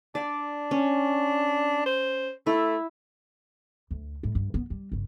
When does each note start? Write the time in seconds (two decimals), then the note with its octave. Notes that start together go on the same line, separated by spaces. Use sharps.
0.15 D4 D5
0.71 C#4
1.86 C5
2.47 A3 E4
3.91 D2
4.23 A2 G3
4.35 G2
4.54 B3
4.70 G3
4.92 G1 C#3